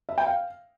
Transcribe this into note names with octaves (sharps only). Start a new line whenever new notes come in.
E5
G5
F5